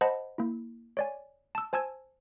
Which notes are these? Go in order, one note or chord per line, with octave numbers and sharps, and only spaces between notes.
C5 D#5 F#5 A5 B5
A#3 E4
C#5 D5 G#5
A5 E6
C5 G#5 A5 E6 G#6